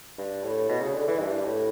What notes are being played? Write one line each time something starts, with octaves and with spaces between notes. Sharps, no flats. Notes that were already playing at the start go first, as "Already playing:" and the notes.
G2
A2
B2
C#3
D3
E3
G2
A2